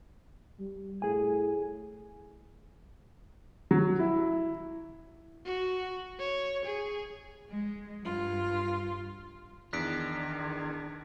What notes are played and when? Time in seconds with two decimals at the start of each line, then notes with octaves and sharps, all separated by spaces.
0.60 G3
1.02 A2 G#4 G#5
3.71 F#3
3.99 E4
5.45 F#4
6.20 C#5
6.65 G#4
7.49 G#3
8.03 G2 F4
9.73 E2 D#3 D4 F#6 B6 D7